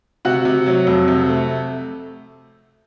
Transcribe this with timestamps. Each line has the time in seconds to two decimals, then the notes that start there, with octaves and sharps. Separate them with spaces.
0.25 C3 F#4 F#5
0.45 C3
0.66 F#3
0.87 F2
1.08 C3
1.29 A3